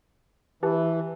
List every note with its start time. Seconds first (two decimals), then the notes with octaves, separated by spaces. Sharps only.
0.63 E3 G4 B4 A5